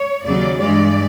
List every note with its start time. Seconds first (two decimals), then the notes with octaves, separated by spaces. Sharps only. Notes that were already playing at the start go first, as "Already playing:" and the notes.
Already playing: C#5
0.24 D#2 C#3 F#3 D5
0.59 G2 E3 G#3 D5